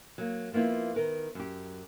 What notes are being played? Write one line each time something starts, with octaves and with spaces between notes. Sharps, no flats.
F#3 A#3
F3 A#3 B3 E4 F4
D#3 A#4 B4
F#2 G4